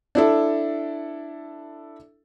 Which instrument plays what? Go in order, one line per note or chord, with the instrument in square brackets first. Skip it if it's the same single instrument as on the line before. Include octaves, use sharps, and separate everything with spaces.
[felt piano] D4 E4 A4